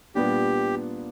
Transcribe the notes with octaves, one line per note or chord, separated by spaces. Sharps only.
A#2 G3 B3 D4 G4